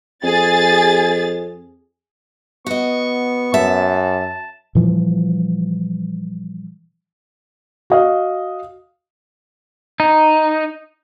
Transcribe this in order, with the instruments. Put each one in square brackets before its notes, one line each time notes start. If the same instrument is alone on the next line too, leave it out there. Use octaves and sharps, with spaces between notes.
[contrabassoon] F2 [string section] G#4 A6
[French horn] B3 [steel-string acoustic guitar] F#4 D#5 [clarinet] C#6
[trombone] F#2 [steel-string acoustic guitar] E5 [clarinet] A5
[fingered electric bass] A#2 E3 F3 G3
[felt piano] F#4 D#5 F5
[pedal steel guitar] D#4